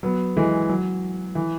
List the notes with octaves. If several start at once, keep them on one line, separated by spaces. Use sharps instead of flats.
F#3 B3
E3 G#3
F#3
E3